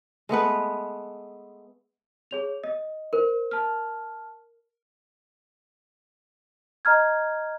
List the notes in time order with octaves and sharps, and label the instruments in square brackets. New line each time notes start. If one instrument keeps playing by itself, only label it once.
[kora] G#3 A3 B3 B4
[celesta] G#4 C#5 F7
D#5
[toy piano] A#4 [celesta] C5
[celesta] A5 F6
D#5 A#5 F6 G#6